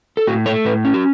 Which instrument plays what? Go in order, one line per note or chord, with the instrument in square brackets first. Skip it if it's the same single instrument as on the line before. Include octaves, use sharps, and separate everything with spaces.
[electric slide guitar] A4
A2 F#4
A3 C#5
A2 B4
C#4
F#4